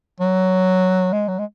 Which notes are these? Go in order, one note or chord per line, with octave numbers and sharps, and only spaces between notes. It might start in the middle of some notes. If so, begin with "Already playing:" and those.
F#3
G#3
F#3
G#3